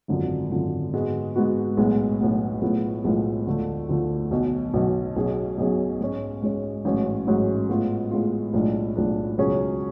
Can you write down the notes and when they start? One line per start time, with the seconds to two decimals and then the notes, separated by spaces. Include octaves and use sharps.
0.08 G#1 F#2 D3 F3
0.50 G#1 F#2 D3 F3
0.94 G#2 G#3 B3 F#4
1.36 G#2 G#3 B3 F#4
1.77 B1 A2 G#3 B3
2.20 B1 A2 G#3 B3
2.61 B1 A2 F3 G#3 B3
3.04 B1 A2 F3 G#3 B3
3.47 D2 D3 F3 A3
3.89 D2 D3 F3 A3
4.31 B1 B2 F#3
4.74 B1 B2 F#3
5.16 B1 B2 F#3 C#4 G#4
5.58 B1 B2 F#3 C#4 G#4
6.00 G#2 G#3 C#4
6.42 G#2 G#3 C#4
6.85 A1 G#2 F#3 C#4
7.27 A1 G#2 F#3 C#4
7.69 A2 G#3 B3 F4
8.11 A2 G#3 B3 F4
8.53 B1 A2 F3 G#3 D4
8.96 B1 A2 F3 G#3 D4
9.38 C#2 B2 F#3 C#4 G#4